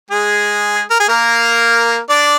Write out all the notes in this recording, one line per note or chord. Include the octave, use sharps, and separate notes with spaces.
G#3 G#4
A#4
G#4
A#3 A#4
D4 D5